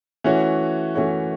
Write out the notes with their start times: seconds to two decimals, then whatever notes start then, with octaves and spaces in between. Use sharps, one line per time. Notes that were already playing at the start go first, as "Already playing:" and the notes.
0.24 E3 A3 C#4 F#4 C#5
0.95 E3 A3 C#4 F#4 C#5